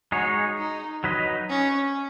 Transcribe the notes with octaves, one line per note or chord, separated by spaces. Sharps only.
G#3 D#4 F#4 G#4 C#5
D#4
F#3 D#4 B4 D#5
C#4